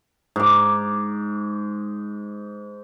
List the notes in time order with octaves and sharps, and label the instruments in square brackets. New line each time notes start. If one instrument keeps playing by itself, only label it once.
[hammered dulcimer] G#2 D6